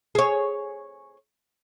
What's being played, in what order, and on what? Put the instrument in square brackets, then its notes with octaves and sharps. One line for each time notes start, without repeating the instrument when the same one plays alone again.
[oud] G#4 C#5